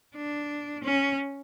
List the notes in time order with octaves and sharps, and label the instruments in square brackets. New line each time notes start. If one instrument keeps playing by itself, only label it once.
[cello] D4
C#4